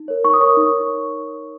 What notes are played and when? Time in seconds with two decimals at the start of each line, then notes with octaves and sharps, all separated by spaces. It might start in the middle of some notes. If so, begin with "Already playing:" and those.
Already playing: D#4
0.08 A#4 C#5
0.24 D#4 C#6
0.34 D#6
0.40 A#4 C#5 C#6
0.57 D#4